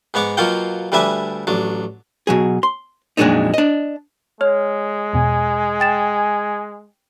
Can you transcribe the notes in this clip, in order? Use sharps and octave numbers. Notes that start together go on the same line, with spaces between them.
G#2 B3 C#5 F#5 D6
B2 F#3 A#3 F4 F#5 G5
D2 G3 D4 B4 E5 G#5
A1 F#3 D4
B2 F#3 G#4
C6
F2 A#2 F#3 G#3 D4 D#4
D4 D#5
G#3 C#5 F6
E2 B2 G#5
G5 A6 E7